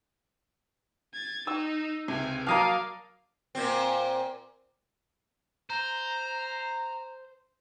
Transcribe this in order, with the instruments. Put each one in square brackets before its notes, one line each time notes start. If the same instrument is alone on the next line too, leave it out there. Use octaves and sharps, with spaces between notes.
[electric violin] G#6 A6
[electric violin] D#4 [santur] E6
[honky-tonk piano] C#2 C3 [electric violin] G#5
[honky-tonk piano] F#3 D6 F6 [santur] A#3 D#5 A5 [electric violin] D5 F5
[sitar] A#2 C4
[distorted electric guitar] C5 [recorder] A#5